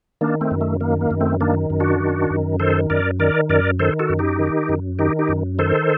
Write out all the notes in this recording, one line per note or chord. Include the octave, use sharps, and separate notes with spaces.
D#3 A#3 D4
A3 C4
F#2
A3
D#3 A#3
A#3
F#2
A3 C4
D#3 A#3 D4
F#2
D4 F#4
D#3
F#2
D#3 A4 C5
F#2 A#4 D5
D#3 A#4 D5
F#2 A#4 D5
D#3 A4 C5
F#4 A4
F#2
D#4 G4
D#3
F#2
D#3 D#4 G4
D#4 G4
F#2
D#3 A4 C5